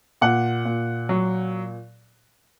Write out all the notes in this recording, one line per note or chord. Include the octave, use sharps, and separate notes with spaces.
A#2 F#5
A#2
F#3